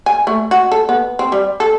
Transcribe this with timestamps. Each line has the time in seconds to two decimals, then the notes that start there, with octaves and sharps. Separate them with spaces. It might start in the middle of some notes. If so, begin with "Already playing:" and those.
0.06 G#5
0.27 A3
0.51 F#4
0.72 A4
0.89 B3
1.19 C4
1.32 G3
1.60 A4